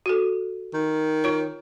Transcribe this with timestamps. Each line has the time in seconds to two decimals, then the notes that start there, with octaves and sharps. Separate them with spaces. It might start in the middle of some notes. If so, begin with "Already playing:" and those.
0.06 F#4 A4
0.74 D#3
1.24 F4 C#5